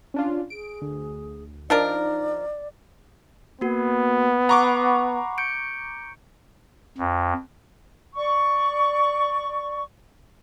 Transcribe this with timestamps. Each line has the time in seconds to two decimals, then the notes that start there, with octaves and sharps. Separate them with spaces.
0.14 C#4 D4 F4
0.50 G#4 D7
0.82 D2
1.70 F3 D4 D#4 A#4 D5
3.61 A#3 B3 F#4
4.49 F#5 A#5 B5 C#6 D6
5.38 G6 C#7 D7
6.98 F2
8.15 D5 C#6